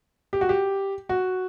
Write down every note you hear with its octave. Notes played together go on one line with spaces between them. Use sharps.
G4
F#4
G4
F#4